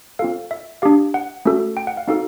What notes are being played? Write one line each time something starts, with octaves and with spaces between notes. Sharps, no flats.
C4 F4 A4 F5
E5
D4 G4 F5
F#5
A3 C#4 F#4 A4
G5
F#5
F5
C4 D#4 F#4 A4 F5